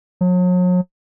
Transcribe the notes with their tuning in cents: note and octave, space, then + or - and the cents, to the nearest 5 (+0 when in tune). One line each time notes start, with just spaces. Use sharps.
F#3 -40